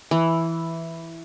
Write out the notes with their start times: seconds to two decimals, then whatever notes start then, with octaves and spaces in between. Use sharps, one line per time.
0.11 E3